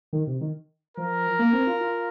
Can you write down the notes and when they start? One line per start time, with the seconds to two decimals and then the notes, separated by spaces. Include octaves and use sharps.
0.13 D#3
0.27 C3
0.41 D#3
0.97 F3 A#4
1.39 A#3
1.53 C4
1.67 F4
1.81 F4